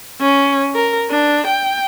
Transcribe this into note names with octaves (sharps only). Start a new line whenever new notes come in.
C#4
A#4
D4
G5